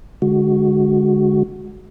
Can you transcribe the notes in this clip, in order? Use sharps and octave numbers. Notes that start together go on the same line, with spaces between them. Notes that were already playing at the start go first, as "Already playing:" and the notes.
D3 G#3 F#4